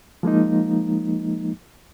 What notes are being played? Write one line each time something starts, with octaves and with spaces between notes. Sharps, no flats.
F3 G#3 A#3 D#4